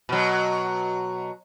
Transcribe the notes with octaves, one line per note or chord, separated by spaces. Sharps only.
B2 F#3